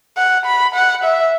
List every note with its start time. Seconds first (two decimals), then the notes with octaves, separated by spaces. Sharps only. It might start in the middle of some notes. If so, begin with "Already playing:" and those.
0.17 F#5
0.46 B5
0.75 F#5
1.04 E5